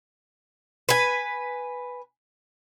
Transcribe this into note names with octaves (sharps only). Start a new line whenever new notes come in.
B4 G#5